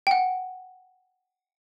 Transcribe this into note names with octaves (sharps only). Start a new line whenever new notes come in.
F#5 G5